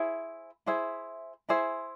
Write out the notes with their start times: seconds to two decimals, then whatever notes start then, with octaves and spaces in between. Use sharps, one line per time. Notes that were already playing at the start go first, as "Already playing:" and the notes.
Already playing: E4 G#4 C5 E5
0.66 E4 G#4 C5 E5
1.49 E4 G#4 C5 E5